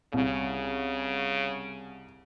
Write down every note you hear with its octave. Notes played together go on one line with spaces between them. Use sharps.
C2 C#3